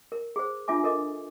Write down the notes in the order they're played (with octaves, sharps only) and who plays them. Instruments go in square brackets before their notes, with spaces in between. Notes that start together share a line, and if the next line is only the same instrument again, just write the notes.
[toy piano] A#4
G#4 C5
D4 F4 E5 G#5 D6
A4 A#4 D#5 D6